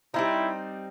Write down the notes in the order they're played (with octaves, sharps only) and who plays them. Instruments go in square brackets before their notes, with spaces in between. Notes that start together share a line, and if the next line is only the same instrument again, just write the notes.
[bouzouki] G3 C4 D#4 [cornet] E4